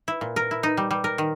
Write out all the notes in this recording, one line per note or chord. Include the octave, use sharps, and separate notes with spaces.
E4
A#2
A#4
E4
D#4
G3
G3
A#4
D#3